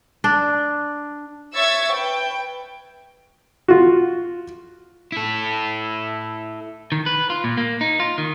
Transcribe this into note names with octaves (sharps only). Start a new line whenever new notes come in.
D4
C#5 E5 C#6 E6 G#6 A6
B4 G5
F4 F#4
E4 A4
D#3
B4
F4
A#2
A#3
D#4
F4
D#3